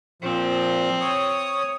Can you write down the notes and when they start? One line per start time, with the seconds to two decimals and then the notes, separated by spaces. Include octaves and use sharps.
0.22 A#2 F3 C4
1.00 C#5 D#6